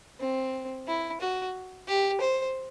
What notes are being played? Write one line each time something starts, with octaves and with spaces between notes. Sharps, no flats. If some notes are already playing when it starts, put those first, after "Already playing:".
C4
E4
F#4
G4
C5